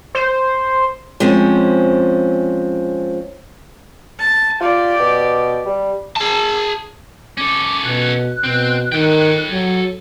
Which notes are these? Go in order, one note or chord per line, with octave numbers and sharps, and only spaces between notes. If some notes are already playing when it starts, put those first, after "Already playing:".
C5
F3 G#3 C4 C#4
A5
F4 G4 D5
B2
G3
G#4 A5
C#4 A4 D6
B2 F#6
B2 C4
D#3 A4 G5
F#3